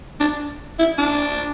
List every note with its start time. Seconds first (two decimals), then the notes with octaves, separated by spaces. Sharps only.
0.20 D4
0.79 E4
0.98 D4